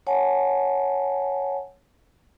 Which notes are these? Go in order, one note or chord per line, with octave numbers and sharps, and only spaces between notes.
C#5 F#5 G#5 A5